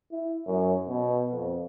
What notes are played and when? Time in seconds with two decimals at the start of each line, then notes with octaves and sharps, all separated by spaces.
0.12 E4
0.47 F#2
0.88 B2
1.32 F2